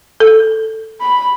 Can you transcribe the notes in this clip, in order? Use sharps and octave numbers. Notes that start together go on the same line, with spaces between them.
A4
B5